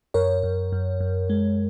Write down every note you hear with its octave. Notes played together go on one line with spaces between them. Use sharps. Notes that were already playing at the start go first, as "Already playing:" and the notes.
F#2 A#4 C#5
F#2
F#2
F#2
G#3